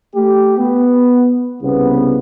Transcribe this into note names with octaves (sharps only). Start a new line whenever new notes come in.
A3 G4
B3
C2 C#3 B3